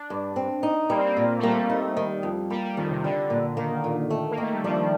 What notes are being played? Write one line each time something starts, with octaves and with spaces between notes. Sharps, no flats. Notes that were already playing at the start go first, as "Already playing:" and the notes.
Already playing: D4
G2
C4
D#4
G3 A#3
C4
A#3
A#2
A3
G3 A#3
D#4
D#3
F2
G3 A#3
G3
F2 D#3
C3
D3 G3
A#2
D#3 A#3
A#2
A3
A#3
D#3 A3
G3
F3 D4